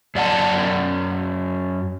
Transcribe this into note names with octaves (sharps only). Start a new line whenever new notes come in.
F#2 D5 F#5 A5